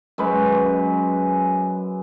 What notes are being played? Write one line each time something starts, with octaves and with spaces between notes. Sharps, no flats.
F#2 G#3 B4